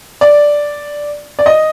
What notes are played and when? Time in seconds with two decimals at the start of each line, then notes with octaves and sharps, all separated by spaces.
0.21 D5
1.39 D5
1.46 D#5